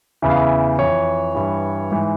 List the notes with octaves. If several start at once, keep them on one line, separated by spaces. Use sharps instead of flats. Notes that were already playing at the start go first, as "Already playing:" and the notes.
E2 C#3 E3 E5
F5
E5
F2 E3 C#5
G2 E3
G#2 E3